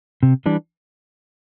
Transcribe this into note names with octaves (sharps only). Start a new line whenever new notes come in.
C3
E3 G3 D4